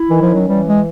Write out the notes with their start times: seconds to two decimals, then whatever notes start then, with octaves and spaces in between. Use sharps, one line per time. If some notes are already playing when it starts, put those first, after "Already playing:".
Already playing: E4
0.10 D#3 E3
0.22 F3
0.29 C#4
0.34 F#3
0.48 E3 G3
0.67 G#3